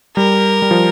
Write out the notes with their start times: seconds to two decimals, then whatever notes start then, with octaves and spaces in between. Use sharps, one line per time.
0.17 G3 A#4
0.62 G3
0.71 F3